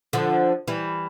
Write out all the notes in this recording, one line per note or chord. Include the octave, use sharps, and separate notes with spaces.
D3 F3
E3 G3